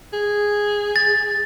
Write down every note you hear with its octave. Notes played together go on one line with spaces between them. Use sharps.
G#4
A6